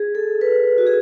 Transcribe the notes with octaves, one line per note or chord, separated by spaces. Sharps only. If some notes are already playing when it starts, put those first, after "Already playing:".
Already playing: G#4
A4
B4
F#4
G#4